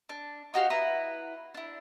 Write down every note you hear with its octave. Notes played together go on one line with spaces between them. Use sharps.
D4
D#4 F#4 G4 F5
E4 B4 A#5
D4 E4